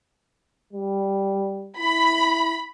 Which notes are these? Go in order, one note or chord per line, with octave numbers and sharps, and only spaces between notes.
G3
E4 B5